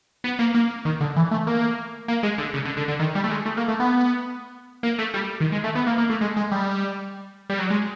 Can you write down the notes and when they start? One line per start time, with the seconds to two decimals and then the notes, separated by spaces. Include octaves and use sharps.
0.24 B3
0.39 A#3
0.55 A#3
0.85 D#3
1.01 D3
1.16 E3
1.31 A3
1.47 A#3
2.08 A#3
2.23 G#3
2.38 D3
2.54 C#3
2.65 D3
2.77 D3
2.88 D3
3.00 D#3
3.15 G3
3.24 A3
3.31 G#3
3.46 A3
3.57 A#3
3.68 A3
3.80 B3
4.83 A#3
4.99 A3
5.14 G3
5.40 D#3
5.52 G#3
5.64 A3
5.75 B3
5.87 A#3
5.98 A#3
6.10 A3
6.21 G#3
6.37 G#3
6.52 G3
7.50 G3
7.59 F#3
7.70 G#3